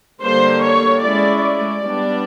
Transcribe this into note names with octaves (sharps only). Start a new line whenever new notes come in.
D3 G3 A#3 C5
C#5
G#3 C#4 E4 D5
D5
G3 B3 D4